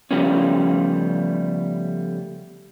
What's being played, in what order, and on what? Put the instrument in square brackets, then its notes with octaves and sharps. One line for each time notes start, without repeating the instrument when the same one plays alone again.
[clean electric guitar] C#3 F3 G3 A3 B3 C#4